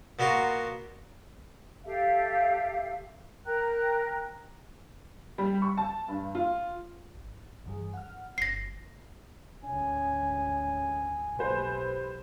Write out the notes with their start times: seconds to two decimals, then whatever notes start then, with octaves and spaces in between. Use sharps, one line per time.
0.19 A#2 B3 F#4 A#4 C6 C#6
1.84 G4 A4 E5 F5
3.45 A#4 G5 A#5 F#6
5.38 G3
5.62 C#6
5.77 A5
6.08 G2
6.35 F4
7.14 G#1
7.66 G2 E3 G#4
7.94 F#5 F6
8.38 G1 A#6 C7
9.64 D2 G#2 C#4 G#5
11.39 B1 E3 A3 G4 B4 C5